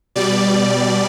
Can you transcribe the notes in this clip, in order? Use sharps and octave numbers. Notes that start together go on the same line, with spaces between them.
B2 G3 D5